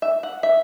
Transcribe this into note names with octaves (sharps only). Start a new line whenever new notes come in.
E5
F#5
E5